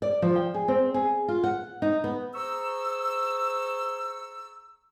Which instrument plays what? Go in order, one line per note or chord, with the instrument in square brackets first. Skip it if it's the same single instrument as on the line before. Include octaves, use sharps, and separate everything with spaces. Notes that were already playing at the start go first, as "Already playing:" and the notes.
[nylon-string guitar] D5
F3
G5
G#4
C4
G#4
F4
F#5
D#4
B3
[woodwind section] G#4 C5 A#5 C#6 E6